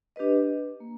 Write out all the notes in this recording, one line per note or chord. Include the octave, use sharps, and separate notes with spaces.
D4 G4 B4 D#5
A#3